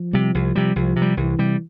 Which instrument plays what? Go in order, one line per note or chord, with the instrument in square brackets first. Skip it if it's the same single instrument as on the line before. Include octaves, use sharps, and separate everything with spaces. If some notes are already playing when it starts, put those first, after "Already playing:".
Already playing: [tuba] F3
[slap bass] C3 G3
C2
C3 G3
[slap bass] C2 [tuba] F3
[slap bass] C3
G3
[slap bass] C2 [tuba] E3
[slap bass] C3 G3